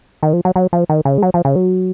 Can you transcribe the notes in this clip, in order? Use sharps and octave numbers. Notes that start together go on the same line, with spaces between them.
D#3
F3
F#3
F#3
F3
D#3
C#3
G#3
F#3
F3
C#3
F#3